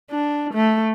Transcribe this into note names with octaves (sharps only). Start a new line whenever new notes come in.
D4
A3